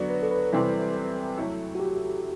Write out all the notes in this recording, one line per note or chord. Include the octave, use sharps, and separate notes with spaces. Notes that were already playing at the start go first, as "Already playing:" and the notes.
Already playing: D3 F#3 B3 F#4 B4 D5
B4
A4
B4
C3 E3 G3 C4
F#3 A3 E4 A4
F#4
G4